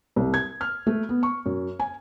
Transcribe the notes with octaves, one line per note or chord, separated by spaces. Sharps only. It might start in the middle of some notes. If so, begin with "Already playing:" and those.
C2
G#6
F6
A3
B3
C#6
F#2
G#5